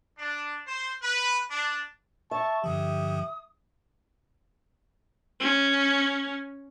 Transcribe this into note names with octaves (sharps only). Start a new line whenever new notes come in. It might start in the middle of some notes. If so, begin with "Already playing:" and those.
D4
C5
B4
D4
E5 A5 C#6
G2 D3 F3 G4 D#6
C#4